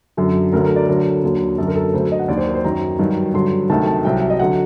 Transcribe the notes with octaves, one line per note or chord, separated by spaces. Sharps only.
F#2 D3 F#3
D2 D3 F#3 A#4
A#4
D5
D2 D3 F#3 A#4
D#2 D3 F#3
F#2 D3 F#3 A4
A#4
A4
A#4
D2 D3 F#3 C5
D#5
F#5
D#2 D#3 F#3 D5
C5
A#4
C5
F#2 D#3 F#3 A#5
G2 D#3 F#3
G2 D3 F#3 C6
D2 C3 D#3 F#3 A5
A5
C2 C3 F#3 G5
D#5
D3 F#3 F#5